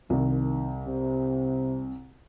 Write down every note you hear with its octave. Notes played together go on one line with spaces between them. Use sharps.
C2 D#3
C3